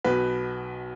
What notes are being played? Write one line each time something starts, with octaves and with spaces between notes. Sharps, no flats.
B1 B2 B4